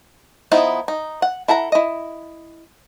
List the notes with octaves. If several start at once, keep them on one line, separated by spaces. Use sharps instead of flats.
F3 B3 D#4 E4
D#4
F#5
E4 A4 F#5 A#5
E4 D#5